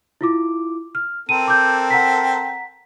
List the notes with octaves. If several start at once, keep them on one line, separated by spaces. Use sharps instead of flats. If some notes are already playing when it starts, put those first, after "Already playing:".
E4 F4 D6
F6
C4 A4 A#4 D#7
D6 G6
F#5 A#5 B6